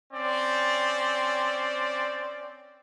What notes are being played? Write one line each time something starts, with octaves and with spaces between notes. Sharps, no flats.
C4 C#4 D5